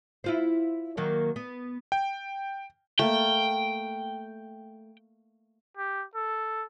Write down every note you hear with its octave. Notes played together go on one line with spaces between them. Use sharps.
E4 F4 C5
D#3 F#3 A#3
B3
G5
A3 A#3 G5
G4
A4